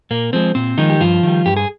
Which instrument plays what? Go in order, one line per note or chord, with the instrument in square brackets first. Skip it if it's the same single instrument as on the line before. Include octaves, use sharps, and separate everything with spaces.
[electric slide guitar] A#2 A#3
F3 G#3 C4
A#2 C4
D#3 F3 G#3 D#4
G4
G2 F3 F4
D#3 G3
G2 G4
G#4